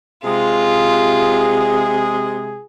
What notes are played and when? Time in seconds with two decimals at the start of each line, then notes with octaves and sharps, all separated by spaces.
0.24 C3 G#3 F4 G#4